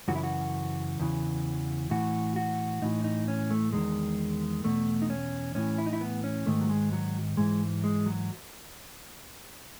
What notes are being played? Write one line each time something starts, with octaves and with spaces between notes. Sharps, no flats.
F#2 C#3 E3 F#4
E4
F#4
E2 C#3 E3
A2 E3 F#4
F#4
A2 E3 D#4
D#4
C#4
A3
E2 D#3 G#3
E2 B2 A3
D#4
C#4
A2 E3 C#4
E4
D#4
E4
B3
C#4
G#2 D#3 A3
F#3
G#3
F#3
G#2 E3 G#3
G#3
F#3